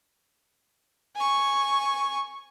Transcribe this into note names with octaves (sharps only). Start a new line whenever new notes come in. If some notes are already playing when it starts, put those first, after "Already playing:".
G#5 C#6